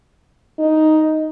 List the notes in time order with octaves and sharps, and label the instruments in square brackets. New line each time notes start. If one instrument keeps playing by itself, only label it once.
[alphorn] D#4